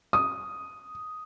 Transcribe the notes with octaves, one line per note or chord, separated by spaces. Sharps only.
D#6